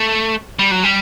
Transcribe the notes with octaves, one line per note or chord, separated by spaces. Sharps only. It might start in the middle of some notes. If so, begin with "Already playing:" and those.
Already playing: A3
G3
F#3
G3